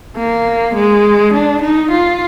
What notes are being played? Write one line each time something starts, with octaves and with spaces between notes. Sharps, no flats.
A#3
G#3
D4
D#4
F4